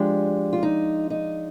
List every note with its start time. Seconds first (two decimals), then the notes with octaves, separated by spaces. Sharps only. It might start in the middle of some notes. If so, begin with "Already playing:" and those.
Already playing: F3 G#3 D4 G4
0.53 F4
0.63 D#4
1.10 D#4